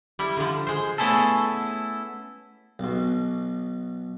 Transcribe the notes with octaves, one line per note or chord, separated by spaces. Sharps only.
G3 E4
D3 F3
G#3 C5
A3 B3 C#4 E4 G#4 A4
B1 B2